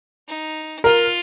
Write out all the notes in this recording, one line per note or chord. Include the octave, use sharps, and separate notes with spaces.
D#4
F4 A#4